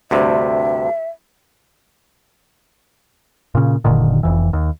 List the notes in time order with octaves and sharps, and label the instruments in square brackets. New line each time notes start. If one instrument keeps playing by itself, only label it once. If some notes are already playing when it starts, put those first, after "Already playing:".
[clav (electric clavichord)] D2 G2 C3 [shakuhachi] E5
[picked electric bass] A#2 C#3
F#1 A#2 D3 D#3
F1 F2 E3
D#2